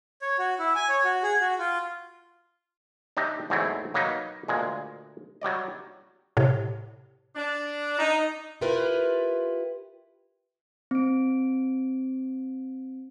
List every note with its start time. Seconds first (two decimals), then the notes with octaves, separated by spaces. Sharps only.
0.22 C#5
0.39 F#4
0.59 E4
0.75 G#5
0.89 C#5
1.05 F#4
1.23 G#4
1.40 F#4
1.59 F4
3.17 D4 D#4 G4 D#5 E5
3.50 E2 G#2 F#3 A3 C4 E4
3.94 F#3 A#3 D#4 B4
4.48 D2 A#2 G#3
5.41 F#3 G3 D5 D#5
6.37 A2 C3
7.35 D4
7.98 D#4
8.61 E4 F4 G4 A#4 B4
10.91 C4 D7